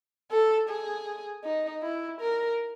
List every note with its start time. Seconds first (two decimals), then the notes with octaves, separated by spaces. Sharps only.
0.31 A4
0.69 G#4
1.45 D#4
1.83 E4
2.21 A#4